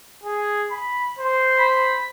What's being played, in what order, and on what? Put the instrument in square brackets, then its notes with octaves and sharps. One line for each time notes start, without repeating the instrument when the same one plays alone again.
[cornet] G#4
B5
C5
[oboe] B5